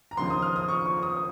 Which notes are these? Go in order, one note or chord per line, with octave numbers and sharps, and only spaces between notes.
A#5
D#2 C#3 F3 C6
D#6
F6
D#6
C#6
C#6
D#6